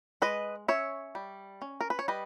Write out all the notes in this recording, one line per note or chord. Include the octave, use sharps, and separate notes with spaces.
G#3 B4 D#5
C#4 C#5 E5
G3
C#4
A#4
B4
C#5
G3 B4 D#5